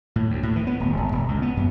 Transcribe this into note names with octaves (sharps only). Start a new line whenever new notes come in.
A2
D2
A2
E3
B3
D1
G#1
E1
C#2
B3
F#2